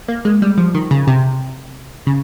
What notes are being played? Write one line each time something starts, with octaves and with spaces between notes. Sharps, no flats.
A#3
G#3
G3
F3
D#3
C#3
C3
C#3